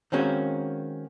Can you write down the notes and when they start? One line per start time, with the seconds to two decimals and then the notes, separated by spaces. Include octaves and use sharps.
0.12 D#3 G#3 A#3 C4 C#4 F#4